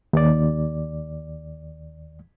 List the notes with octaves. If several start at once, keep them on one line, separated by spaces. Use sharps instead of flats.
D#2 D5